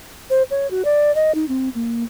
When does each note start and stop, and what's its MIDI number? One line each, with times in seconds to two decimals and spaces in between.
0.30 0.43 72
0.51 0.69 73
0.71 0.83 66
0.85 1.14 74
1.15 1.34 75
1.35 1.45 63
1.49 1.69 60
1.75 2.04 58